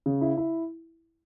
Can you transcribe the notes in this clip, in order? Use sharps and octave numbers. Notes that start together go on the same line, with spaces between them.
C#3
E4
E4